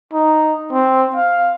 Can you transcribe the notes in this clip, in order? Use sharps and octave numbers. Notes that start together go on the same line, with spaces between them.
D#4
C4
F5